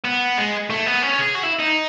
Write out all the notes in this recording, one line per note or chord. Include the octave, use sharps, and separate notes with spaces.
B3
G#3
A3
B3
C#4
G#4
F#4
E4
D#4